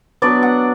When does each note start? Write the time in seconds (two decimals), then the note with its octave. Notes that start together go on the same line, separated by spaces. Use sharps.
0.22 F#3 B3 D4 D5
0.43 F#5